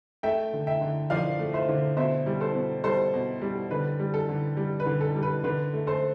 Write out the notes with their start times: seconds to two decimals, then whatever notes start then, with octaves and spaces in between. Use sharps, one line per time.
0.23 A3 E5 G5
0.53 D3
0.67 E5 G5
0.81 D3
1.10 F3 D5 F5
1.39 A3
1.53 C5 E5
1.69 D3
1.97 B2 C5 E5
2.26 G3
2.41 A4 C5
2.55 B2
2.84 G3 A4 C5
3.14 B2
3.42 G3
3.71 D3 B4
3.99 G3
4.14 A4
4.29 D3
4.57 G3
4.80 B4
4.86 D3
5.01 A4
5.16 G3
5.23 B4
5.44 D3 B4
5.74 A3
5.87 A4 C5